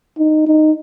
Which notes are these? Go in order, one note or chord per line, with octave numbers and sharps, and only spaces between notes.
D#4
D#4